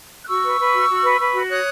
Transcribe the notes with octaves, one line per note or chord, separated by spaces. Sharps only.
F#6
F#4 C#6 E6
B4
B4
F#4
F#4
B4
B4
F#4
C#5 D#6 F#6